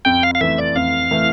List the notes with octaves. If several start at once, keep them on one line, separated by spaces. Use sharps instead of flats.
F2 G5
F5
F5
E3 A3 E5
D5
F2 F5
E3 A3